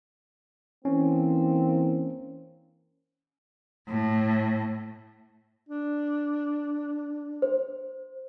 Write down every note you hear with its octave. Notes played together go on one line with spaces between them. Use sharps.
E3 A#3 C4 C#4
A2
D4
C5